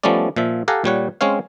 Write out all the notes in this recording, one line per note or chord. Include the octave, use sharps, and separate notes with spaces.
F3 G3 A3 B3 C#4 D5
A#2 F3 E5
G4 A4 F5 F#5 G#5 A#5
A#2 G3 C#5 F#5
G#3 C4 C#4 C#5 F5